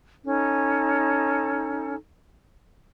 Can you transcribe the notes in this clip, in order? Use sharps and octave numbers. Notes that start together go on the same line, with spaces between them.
C#4 D#4 A4